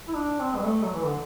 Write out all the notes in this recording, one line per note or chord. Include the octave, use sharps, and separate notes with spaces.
E4
D4
C4
G3
A3
F#3
E3
D3